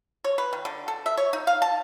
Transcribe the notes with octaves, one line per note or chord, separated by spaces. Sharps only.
C#5
B4
D#3
D3
A4
E5
C#5
D#4
F5
A5